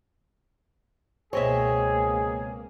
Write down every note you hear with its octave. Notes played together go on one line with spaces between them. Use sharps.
C#2 B2 A#3 C4 G#4 C#5 D#5 E5